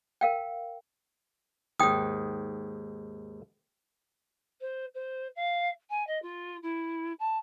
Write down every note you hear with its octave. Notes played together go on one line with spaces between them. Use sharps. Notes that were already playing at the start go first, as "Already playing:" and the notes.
A#4 F5 G5
D#2 G#2 G5 D#6
C5
C5
F5
G#5
D#5
F4
E4
A5